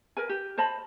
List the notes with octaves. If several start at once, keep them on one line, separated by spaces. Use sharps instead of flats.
A#4 B4 G#5
G4
C5 D#5 A5 B5